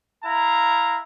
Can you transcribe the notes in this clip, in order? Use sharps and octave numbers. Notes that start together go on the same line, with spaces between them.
E4 F5 A#5